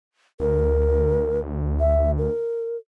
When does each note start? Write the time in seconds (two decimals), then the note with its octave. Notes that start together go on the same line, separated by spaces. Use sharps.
0.40 D2 A#4
1.80 E5
2.18 A#4